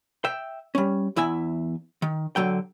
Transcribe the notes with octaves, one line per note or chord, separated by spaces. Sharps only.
E5 G5
G3 C#4
E2 E4 E5 G#5
D#3
D3 F#3 G5